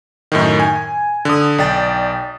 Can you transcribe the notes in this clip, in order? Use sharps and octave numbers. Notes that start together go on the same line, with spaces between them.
F#2 A2 D#3
G#5
D3 D#6
B1 D5 G5 A6